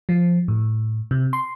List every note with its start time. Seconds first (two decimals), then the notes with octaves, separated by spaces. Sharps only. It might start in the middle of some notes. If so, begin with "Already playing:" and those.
0.09 F3
0.48 A2
1.11 C3
1.33 C6